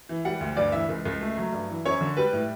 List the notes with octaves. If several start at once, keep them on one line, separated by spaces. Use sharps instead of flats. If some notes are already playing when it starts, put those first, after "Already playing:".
E3
G3 F#5
D2
G2 D5
E3 E5
C#2
C#2
A3
F#3
G2
E3
F#2 C#5
D3
G3 B4
A2